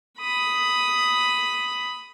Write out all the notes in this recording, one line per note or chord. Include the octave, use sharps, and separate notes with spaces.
B5 D#6